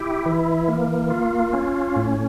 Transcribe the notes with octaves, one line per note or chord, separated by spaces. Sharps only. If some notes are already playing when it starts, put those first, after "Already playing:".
Already playing: E4 G4
E3
A#3
F4
C#4
A2